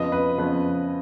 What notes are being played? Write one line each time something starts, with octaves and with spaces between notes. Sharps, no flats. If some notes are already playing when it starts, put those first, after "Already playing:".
Already playing: F2 C#3 F3 B3 D#5
B4
F2 C#3 F3 B3 B4